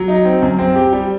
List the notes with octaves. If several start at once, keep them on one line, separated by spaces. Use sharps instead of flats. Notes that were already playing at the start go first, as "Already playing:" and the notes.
Already playing: F#3
D#4
C4
F#2
C4
G4
G3